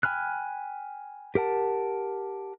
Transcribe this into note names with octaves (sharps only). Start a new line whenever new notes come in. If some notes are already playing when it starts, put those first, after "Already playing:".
G5 G#5 B5 F6 F#6
G4 A#4 F#5 A5